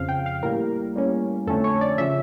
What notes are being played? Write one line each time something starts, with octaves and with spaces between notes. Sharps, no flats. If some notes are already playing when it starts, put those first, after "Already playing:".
Already playing: F2 C#3 F3 F5
G5
F5
A2 G3 A#3 A#4
A2 G3 A#3 C#4
F2 D3 A3 C#4 A4
C#5
D5
C#3 F3 C#4 E5